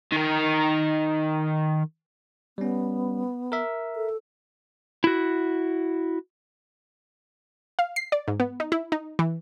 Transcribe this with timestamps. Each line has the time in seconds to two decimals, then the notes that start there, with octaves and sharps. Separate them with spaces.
0.12 D#3 A#4
2.58 G3 B3 C#4
3.52 A#4 E5
3.96 A4
5.04 E4 F#4
7.79 F5
7.96 C7
8.12 D5
8.28 G#2
8.40 B3
8.60 D#4
8.72 E4
8.92 D#4
9.19 E3